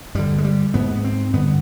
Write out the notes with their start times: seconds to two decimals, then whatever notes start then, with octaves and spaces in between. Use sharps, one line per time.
0.15 G2 D3 G3
0.38 G#3
0.44 G3
0.74 G#2 B3
0.95 B3
1.04 C4
1.33 G2 D3 B3